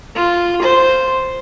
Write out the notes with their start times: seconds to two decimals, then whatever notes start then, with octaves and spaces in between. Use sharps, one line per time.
0.15 F4
0.62 C5